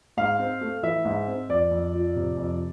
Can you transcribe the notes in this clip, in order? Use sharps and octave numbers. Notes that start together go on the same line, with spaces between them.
G#2 F5
C4
A3
E3 E5
G#2
C4
F2 D5
F2
F3
C3
F2